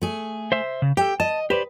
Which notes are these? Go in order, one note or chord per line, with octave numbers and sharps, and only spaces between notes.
A3 G#4
C5 E5
C#3
G4 A4 G5
D#5 A5
G4 B4 C5 D5